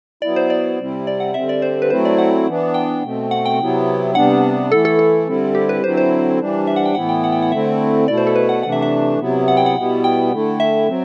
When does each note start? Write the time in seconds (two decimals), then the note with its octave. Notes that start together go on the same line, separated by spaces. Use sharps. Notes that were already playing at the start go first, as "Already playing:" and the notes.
0.22 F#3 B3 E4 D5
0.36 C5
0.50 D5
0.79 C3 G3 C4 E4
1.07 D5
1.20 F#5
1.34 D3 G3 C4 E5
1.49 D5
1.62 C5
1.82 B4
1.90 F#3 A3 C4 E4 C5
2.05 D5
2.18 F#5
2.47 E3 B3 D4
2.74 G5
3.03 B2 A3 C4
3.31 F#5
3.46 G5
3.59 C3 F#3 B3 E4
4.15 C3 G3 B3 D4 F#5
4.72 E3 A3 E4 A4
4.85 A4
4.99 A4
5.27 D3 G3 C4 E4
5.55 G4
5.69 B4
5.83 D3 F#3 C4 E4 C5
5.97 C5
6.40 E3 G3 D4
6.67 E5
6.76 F#5
6.85 G5
6.95 A2 E3 B3 E4 F#5
7.09 G5
7.24 F#5
7.32 G5
7.42 F#5
7.51 D3 A3 C4 E4 E5
8.08 B2 A3 E4 D5
8.17 C5
8.27 A4
8.35 B4
8.49 F#5
8.63 C3 E3 A3 D4 F#5
8.72 E5
8.82 E5
9.19 C3 F#3 B3 E4
9.48 F#5
9.57 G5
9.66 F#5
9.76 B2 G3 B3 E4
10.04 G5
10.32 D3 A3 E4
10.60 E5
10.88 F#3 C4